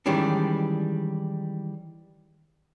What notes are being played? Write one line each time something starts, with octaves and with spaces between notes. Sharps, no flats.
D#3 E3 G3 G#3 C#4 D4